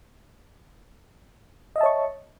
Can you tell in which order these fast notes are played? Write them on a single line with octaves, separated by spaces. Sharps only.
D#5 E5 A5 C#5 C#6